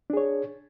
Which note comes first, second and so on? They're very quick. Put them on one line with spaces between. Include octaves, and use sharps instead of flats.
D4 G#4 C#5